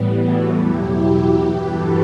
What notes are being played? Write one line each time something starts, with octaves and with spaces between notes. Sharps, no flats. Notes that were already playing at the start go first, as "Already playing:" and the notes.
Already playing: A2 E3 G3 B3
F#4 A4
E2 B2 F#3 E4 G4
G2 E3 G4 B4
F#4 A4